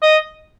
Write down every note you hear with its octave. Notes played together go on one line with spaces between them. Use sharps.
D#5